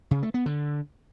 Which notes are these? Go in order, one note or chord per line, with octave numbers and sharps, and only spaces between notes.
C#3
A3
B3
D3